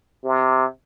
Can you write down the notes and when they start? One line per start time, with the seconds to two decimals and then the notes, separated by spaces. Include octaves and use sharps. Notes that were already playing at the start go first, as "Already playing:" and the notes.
0.24 C3